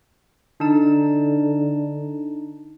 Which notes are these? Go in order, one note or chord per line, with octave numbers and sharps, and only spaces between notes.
D3 D4 D#4 A5